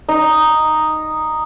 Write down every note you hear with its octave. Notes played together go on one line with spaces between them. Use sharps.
D#4